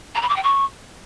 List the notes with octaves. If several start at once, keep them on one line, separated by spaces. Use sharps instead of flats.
A#5
B5
D6
G5
C#6